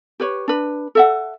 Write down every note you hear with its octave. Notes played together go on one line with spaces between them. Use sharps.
G4 B4 C#5
D4 B4
A4 E5 F#5